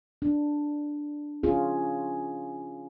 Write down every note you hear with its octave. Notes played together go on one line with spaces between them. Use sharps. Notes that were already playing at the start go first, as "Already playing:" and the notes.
D4
C#4 F4 G#4